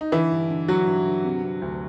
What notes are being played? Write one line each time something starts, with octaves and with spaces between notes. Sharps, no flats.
D#4
D3 E3 E4
G2
D3
D3 F#3 F#4
G2
D3
C3
C3
D2